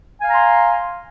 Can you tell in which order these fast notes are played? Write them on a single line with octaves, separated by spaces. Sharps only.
G#5 F5 A#5 C6